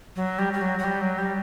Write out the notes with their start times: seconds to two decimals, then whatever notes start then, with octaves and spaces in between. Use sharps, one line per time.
0.16 F#3
0.39 G3
0.53 G3
0.61 F#3
0.79 F#3
0.84 G3
1.01 F#3
1.18 G3